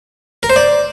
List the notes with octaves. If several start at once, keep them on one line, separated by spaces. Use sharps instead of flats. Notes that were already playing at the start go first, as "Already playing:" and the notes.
A#4
C5
D5